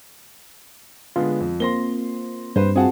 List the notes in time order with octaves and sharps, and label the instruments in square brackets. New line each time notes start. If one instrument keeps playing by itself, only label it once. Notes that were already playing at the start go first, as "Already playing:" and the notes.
[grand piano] D3 G#3 B3 [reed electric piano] F4
[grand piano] F2
[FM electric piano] A#3 C4 [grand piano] C6 A#6 G7
[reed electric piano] G2 [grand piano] B4 C5
[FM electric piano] C4 F4 F#4 [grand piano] G#4 F#5 A5